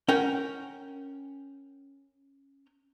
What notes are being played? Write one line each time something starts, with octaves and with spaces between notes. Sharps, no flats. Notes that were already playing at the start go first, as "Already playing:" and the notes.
C#4 A#4 F#5 G5